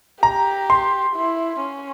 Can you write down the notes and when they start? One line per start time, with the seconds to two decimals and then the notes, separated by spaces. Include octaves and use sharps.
0.23 G4 A#5
0.70 C6
1.16 E4
1.62 C#4